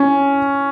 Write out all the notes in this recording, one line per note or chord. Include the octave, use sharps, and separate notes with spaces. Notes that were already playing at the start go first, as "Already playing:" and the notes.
Already playing: C#4